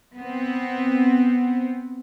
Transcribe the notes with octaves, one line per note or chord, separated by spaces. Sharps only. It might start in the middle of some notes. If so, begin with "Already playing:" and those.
B3 C4